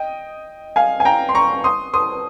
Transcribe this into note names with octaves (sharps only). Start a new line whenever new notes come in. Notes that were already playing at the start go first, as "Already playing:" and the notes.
Already playing: D#5 G5
F5 G#5
G#5
G5 A#5
C6
A#5 C#6
C6 D#6
C6 D#6